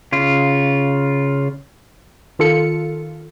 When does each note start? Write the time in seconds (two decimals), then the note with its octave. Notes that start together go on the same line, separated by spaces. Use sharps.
0.12 C#3 F4
2.39 D#3 F4 A4 C#7